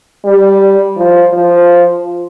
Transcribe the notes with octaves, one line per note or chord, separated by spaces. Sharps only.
G3
F3
F3